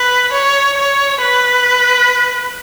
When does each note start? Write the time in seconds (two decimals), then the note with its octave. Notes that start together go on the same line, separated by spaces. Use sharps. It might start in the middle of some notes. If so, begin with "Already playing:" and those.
Already playing: B4
0.32 C#5
0.77 C#5
1.21 B4